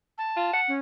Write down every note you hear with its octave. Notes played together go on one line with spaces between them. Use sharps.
A5
F4
F#5
C#4